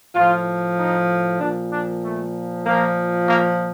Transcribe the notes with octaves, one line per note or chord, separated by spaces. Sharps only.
A2 F3 F4
D#4
A#2 F3 D4
D4
A3
A#2 F3 A#3
A#3